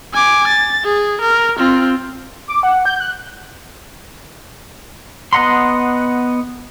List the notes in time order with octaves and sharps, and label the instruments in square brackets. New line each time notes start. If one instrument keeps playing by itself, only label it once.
[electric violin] G#5 D6
A6
G#4
A#4
C4 F4
[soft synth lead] D6
F#5
G6
F#6
[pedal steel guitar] B3 D#5 F#5 A#5 C6